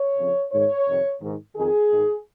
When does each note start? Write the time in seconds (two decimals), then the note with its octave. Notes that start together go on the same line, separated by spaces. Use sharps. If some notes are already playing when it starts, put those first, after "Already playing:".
Already playing: C#5
0.18 F2 C#3
0.52 G#2 D#3 C#5
0.87 F2 C3 D#3
1.22 G#2 D#3
1.56 F2 D#3 G#4
1.91 G#2 D#3